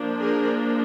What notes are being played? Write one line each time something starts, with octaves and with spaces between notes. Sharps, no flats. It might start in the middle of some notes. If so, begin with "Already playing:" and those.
Already playing: F3 A#3 D4
G#4 A#4